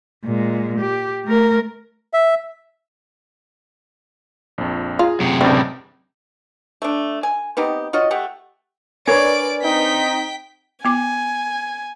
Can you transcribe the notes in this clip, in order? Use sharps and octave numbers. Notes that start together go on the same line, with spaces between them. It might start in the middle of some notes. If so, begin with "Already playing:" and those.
A#2 G#3
G4
A3 A#4
E5
A#1 F2
F4 G#4 A#5
F#2 C3
C#2 A2 D3 C4 A5 A#5
A3 D4
G#5
B3 C4 D#4 G4
F4 F#4 C#5 D#5
A3 G4 F#5
D4 A#4 B4 C#5 D5 G#5 D7
C4 D#4 G5 B6
B3 G#5 D6